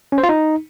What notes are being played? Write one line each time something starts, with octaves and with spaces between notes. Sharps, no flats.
C#4
C5
F4
D#4